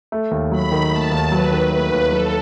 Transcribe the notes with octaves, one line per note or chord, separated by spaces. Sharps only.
A3
D#2
F#3 B5
D#3
A3 A5
D#2
F#3 B4
D#3
A3 B4
D#2
F#3 A4